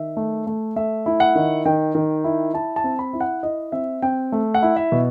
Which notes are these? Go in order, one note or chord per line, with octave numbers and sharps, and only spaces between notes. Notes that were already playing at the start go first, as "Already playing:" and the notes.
Already playing: D#3 E5
A3
A3
A3 E5
E4
F#5
D#3
D#3 G5
D#3
E4
E4 A5
A5
C4
B5
E4
F#5
E4 D#5
C4 E5
C4 G5
A3
F#5
E4
E5
B2